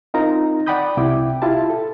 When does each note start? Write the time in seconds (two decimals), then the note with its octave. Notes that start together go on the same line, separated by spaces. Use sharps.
0.14 C4 D#4 F4 A#4 A#5
0.66 D5 F#5 G5 B5 D#6 G6
0.97 C2 C3 E4 G5 D6
1.42 E4 F4 G4 A5
1.70 A4